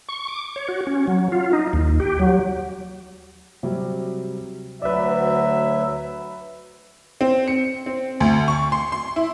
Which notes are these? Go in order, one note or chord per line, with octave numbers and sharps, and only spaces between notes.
C#6
D6
C#5
F#4
C#4
F#3
F4
D#4
D#2
G4
F#3
C3 F#3 G3
D2 F#3 B4 D5 E5
C4
C#7
C4
D2
C#6
C6
C6
E4